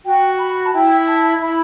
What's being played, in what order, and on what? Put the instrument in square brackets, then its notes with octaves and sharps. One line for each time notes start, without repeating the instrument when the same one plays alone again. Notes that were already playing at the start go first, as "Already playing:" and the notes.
[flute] F#4 [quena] G5
[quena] B5
A5
[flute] E4 [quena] G5
[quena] A5
[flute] E4 [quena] B5